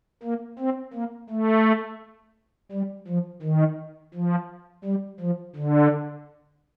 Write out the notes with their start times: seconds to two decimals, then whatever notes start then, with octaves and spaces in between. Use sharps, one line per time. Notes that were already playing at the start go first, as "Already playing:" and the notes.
0.23 A#3
0.59 C4
0.94 A#3
1.30 A3
2.72 G3
3.07 F3
3.42 D#3
4.14 F3
4.85 G3
5.20 F3
5.56 D3